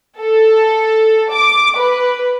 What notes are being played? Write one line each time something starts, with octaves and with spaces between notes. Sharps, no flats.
A4
D6
B4